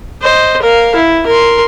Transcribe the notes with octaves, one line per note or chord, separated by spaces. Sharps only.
C5 D#5
A#4 F5
E4
A#4 C6